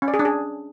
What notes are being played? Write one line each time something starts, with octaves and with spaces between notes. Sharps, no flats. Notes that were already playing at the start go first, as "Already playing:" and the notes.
C#4
D5
G#4
D4
G#4